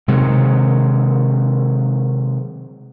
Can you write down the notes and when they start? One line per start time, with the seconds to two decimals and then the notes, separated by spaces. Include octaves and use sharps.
0.08 C3 D#3 F#3 G#3